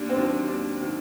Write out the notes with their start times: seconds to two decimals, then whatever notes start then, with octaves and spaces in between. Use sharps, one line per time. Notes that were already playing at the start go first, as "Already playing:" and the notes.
Already playing: D#2 D4
0.09 C4
0.16 D#3 F#3 D4
0.48 D#2 D4
0.81 D#3 F#3